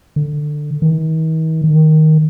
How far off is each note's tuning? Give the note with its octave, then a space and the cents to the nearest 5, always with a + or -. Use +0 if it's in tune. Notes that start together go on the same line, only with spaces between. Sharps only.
D3 +15
D#3 +45
D#3 +5